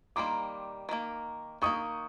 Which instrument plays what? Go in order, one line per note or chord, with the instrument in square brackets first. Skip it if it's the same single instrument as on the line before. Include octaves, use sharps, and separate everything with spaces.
[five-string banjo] D#3 G3 A#3 [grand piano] C6 D6
[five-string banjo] D#3 G3 A#3
[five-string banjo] D#3 G3 A#3 [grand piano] C#6 D#6